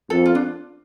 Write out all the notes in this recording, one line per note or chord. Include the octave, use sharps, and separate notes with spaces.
F2 A4
F4
D4